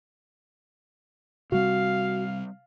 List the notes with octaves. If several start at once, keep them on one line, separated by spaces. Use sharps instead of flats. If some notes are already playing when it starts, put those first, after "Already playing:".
C3 G3 C4 F#4 F5